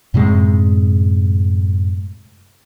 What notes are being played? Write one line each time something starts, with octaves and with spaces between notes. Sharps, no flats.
F#2 A2 C3 G#3